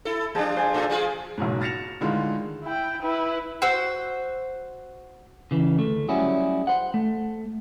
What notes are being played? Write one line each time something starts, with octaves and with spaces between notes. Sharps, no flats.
E4 A4
F3 G3 D4 G#4 A5
C5 G#5
A2 D4 A4
G3 F4 G#4
F#1 B1 G#2
F6 A6 A#6 C#7 E7 F7
A2 D3 D#3 G#3 F4 C6
E4 G5
E4 B4
F#4 C5 E6
C#3 E3
D2 A3
F#3 G3 C#4 E4 F#4 G#4
C5 F#5
A3